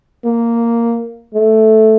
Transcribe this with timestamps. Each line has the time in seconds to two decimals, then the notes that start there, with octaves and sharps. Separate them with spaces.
0.25 A#3
1.34 A3